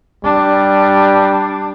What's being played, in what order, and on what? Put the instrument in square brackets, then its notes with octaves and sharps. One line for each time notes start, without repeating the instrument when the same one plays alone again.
[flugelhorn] G3 [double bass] D4